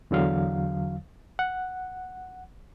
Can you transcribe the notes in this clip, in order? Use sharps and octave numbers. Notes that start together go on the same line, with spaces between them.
E2 D3 F#3 F5
F#5